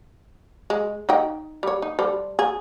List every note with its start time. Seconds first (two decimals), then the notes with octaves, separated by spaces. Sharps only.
0.70 G#3
1.09 D#4 D#5 G5
1.63 G3 C#5
1.82 D#4
1.99 G3 A4 C5
2.39 G#4